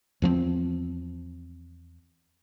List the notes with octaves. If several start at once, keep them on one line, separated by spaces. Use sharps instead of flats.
E2 F3 B3 C4